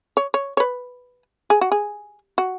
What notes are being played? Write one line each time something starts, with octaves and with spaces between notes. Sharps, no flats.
C#5
C#5
C#5
B4
G#4
F#4
G#4
F#4